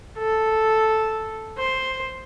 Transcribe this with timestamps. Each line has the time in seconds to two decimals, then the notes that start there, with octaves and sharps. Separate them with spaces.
0.18 A4
1.58 C5